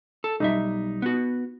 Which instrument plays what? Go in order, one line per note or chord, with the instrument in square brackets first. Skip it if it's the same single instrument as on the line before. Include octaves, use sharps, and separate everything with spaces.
[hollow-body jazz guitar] A4
[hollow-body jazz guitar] B1 G3 E5 [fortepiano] D#4
[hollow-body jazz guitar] B3 F#4